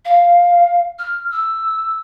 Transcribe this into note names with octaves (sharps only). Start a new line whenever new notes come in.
F5
F6
E6